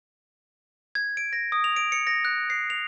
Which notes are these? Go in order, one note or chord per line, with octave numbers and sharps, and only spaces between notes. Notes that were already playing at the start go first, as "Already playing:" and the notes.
G#6
D7
A#6
D#6
F7
D7
C#7
A#6
F#6
C7
F7